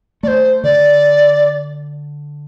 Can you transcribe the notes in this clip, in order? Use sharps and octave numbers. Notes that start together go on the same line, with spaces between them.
A3 C5 D5
D3 D5